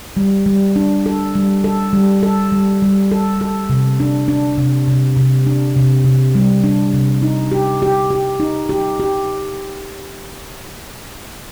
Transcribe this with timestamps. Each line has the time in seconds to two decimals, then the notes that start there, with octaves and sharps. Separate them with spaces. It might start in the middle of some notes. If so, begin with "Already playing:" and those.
0.17 G3
0.46 G3
0.76 D4
1.06 A4
1.35 G3
1.64 A4
1.93 G3
2.23 A4
2.52 G3
2.82 G3
3.11 A4
3.41 A4
3.69 C3
4.00 D4
4.28 D4
4.58 C3
4.88 C3
5.17 C3
5.47 D4
5.76 C3
6.04 C3
6.35 G3
6.64 D4
6.93 C3
7.22 D#4
7.52 G4
7.82 G4
8.10 G4
8.40 D#4
8.69 G4
9.00 G4